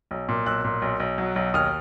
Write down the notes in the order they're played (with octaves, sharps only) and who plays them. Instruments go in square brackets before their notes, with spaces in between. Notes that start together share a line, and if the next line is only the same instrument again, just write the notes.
[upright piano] B1
A#2
B1 E6 F#6
A#2
B1
B1
F#3
B1
D#2 D#6 F6